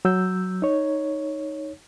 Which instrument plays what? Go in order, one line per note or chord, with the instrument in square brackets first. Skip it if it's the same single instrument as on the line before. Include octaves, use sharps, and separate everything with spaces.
[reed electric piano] F#3 E6 G6
D#4 C#5